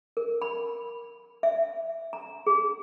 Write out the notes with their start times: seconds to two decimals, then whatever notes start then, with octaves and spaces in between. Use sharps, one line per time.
0.17 A#4
0.42 B5
1.43 E5
2.13 A#5
2.47 G#4